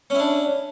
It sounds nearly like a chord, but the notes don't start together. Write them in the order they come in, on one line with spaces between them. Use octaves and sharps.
C#4 E4 D4